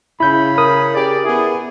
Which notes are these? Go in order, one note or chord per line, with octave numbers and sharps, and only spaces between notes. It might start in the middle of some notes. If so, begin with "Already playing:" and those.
C#3 E4 B5 G6
A#4 D#6
G4 G#4 D5
B3 E4 G#4